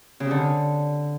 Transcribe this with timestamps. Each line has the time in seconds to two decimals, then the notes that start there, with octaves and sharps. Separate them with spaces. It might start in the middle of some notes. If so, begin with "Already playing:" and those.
0.20 C#3
0.25 C3
0.31 D3